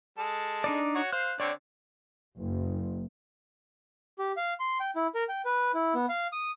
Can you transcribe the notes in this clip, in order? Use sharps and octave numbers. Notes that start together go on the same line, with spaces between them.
G#3 A4
D4 D#4 D5
F#4 C#5
C5 F5 F#6
D3 C4 C#5 D5
F#1
G4
F5
C6
G5
E4
A#4
G5
B4
E4
B3
F5
D#6